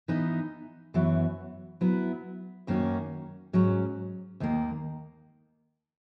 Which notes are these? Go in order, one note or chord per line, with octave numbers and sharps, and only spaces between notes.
E3 B3 D#4
F#2 E3 B3 F#4 C#5
F#3 B3 E4
F#2 D#3 A#3 C#4 F#4
G#2 F#3 C#4
D#2 D#3 A#3